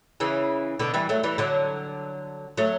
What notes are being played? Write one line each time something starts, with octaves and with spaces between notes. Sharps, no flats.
C#3 E3
B2 D3
E3 G3
F#3 A3
E3 G3
D3 F#3
F#3 A3